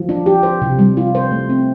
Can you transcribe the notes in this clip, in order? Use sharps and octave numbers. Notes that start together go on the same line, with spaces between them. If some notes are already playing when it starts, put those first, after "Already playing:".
Already playing: F3
D4
G4
C5
C3
G3
F4
C5
A3
C4